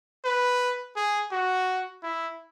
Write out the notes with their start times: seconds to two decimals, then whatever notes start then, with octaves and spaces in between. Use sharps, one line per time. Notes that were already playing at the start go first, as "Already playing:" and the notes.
0.24 B4
0.96 G#4
1.32 F#4
2.03 E4